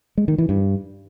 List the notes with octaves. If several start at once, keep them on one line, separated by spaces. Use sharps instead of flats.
G#3
D#3
E3
G2